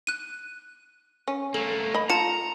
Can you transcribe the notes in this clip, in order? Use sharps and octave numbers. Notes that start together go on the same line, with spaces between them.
F#6 D#7
C#4
A3 A#3 A4
D#5 B5
F4 A5 A#5 C#7